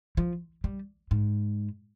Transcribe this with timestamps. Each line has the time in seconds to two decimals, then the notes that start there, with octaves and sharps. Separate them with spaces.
0.17 F3
0.64 G3
1.11 G#2